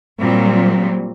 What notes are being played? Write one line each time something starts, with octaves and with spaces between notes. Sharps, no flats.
A#2 F#3 G3 C4